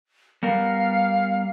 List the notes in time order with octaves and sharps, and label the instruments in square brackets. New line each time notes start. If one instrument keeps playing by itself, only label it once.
[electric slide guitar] G3 B3 A#4 [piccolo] F5